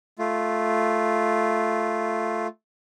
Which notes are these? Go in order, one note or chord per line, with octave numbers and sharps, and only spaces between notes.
A3 F4